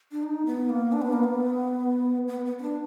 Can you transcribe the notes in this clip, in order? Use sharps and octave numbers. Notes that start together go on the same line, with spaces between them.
D4
D#4
B3
A#3
D4
B3
A#3
B3
B3
B3
B3
D4